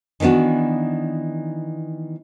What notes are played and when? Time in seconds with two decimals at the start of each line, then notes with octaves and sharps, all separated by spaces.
0.20 D#3 E3 B3 D4 F#4